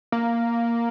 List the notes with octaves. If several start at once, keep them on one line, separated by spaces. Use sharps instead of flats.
A#3